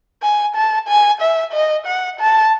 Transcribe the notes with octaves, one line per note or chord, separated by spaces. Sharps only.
G#5
A5
G#5
E5
D#5
F#5
A5